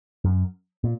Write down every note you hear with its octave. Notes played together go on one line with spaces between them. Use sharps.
F#2
A#2